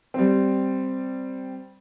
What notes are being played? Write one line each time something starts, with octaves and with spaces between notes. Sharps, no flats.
G3 C4